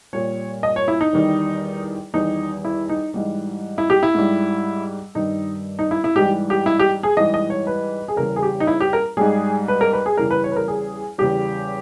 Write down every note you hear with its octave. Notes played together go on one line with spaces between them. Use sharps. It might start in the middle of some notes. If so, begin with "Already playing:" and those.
A#2 G3 C#5
D#5
C#5
E4
D#4
E2 D#3 G3
E2 D#3 G3 D#4
E4
D#4
G#2 E3 G3
E4
G4
E4
G#2 G3
G2 D#3 G3 D#4
D#4
E4
E4
G#2 E3 G3 G4
G4
E4
G4
G#4
G#2 E3 G3 D#5
D#5
C#5
B4
G#4
E2 C#3 G3 A#4
G#4
G4
D#4
E4
G4
A#4
G#2 G3 G#4
B4
A#4
B4
G#4
E2 C#3 E3 G3 A#4
B4
C#5
B4
A#4
G#4
E2 C#3 G3 G4